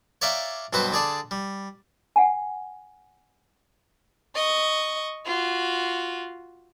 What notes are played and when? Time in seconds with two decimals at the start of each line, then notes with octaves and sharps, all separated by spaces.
0.22 C#5 D5 E5 F5 G5 A#5
0.73 B1 G2 C4 F#4 B4 C5
0.93 D3 G#4 D5 A5
1.31 G3
2.16 F#5 G#5
4.36 D#5 C#6
5.26 F4 F#4